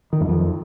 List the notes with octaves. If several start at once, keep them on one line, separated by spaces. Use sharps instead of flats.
D#3
F#2
F2